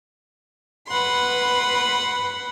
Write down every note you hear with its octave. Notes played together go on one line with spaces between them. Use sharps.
B4 F#5 B5 C6